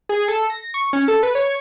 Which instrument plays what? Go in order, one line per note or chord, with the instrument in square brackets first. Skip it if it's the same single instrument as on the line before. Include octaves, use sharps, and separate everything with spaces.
[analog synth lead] G#4
A4
A#6
C#6
C#4
A4
B4
C#5